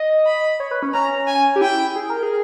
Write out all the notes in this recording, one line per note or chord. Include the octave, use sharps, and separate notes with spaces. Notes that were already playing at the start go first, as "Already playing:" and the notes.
Already playing: D#5
B5
C#5
B4
C#4
C#4 A#5
G#5
G4
E4 G5
G#4
A#4
G#4